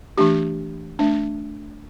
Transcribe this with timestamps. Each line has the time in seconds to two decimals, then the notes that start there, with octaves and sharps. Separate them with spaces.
0.18 E3 A3 D4 G4
0.99 A3 D4